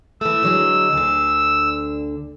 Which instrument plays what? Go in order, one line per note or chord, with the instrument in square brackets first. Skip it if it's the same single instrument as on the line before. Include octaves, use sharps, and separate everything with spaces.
[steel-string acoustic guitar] E3 A3 [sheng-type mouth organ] E6
[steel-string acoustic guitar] D3 F#3 G#3
D2 D3